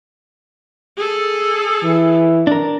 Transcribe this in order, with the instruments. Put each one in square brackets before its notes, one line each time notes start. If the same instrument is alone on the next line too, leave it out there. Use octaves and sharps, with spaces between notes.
[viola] G#4 A4
[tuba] E3
[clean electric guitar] D4 A#4